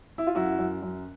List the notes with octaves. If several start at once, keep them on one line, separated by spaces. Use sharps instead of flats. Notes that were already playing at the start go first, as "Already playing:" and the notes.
E4
F4
F#2 E4 F#4
F#2
F#2